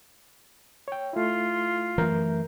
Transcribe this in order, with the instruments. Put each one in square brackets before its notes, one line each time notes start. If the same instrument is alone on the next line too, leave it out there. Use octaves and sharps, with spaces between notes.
[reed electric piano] C#5 G5
[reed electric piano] A3 E4 [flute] F4
[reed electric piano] F#2 A#4 G6 [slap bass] E3 A3